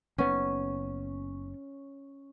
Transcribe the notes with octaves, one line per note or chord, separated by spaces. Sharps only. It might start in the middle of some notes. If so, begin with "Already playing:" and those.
F#1 B3 C#4